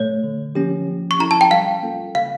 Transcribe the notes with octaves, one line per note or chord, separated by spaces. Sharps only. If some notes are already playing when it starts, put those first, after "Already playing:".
Already playing: A#2 A3 C#5
D3
F3 A#3 C#4 G4
F3
C#6
C#4 E4 A4 A#5
A5
G5
G3 F5
A#3 C#4 F4 A4
C#3 F5